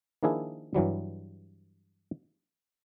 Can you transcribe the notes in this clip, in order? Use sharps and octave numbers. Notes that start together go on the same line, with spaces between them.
D#3 F3 A#3 D4 E4 G#4
G2 E3 F#3 G3